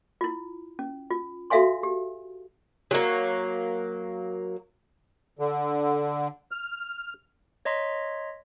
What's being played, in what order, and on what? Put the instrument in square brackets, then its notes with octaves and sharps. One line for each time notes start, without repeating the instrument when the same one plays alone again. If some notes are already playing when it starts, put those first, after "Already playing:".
[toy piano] E4 F4
C#4
F4
F#4 A4 E5 F5 G#5 C6
G4
[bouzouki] F#3 A#3
[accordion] D3
F6
[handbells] C#5 D#5 A#5 C6 B6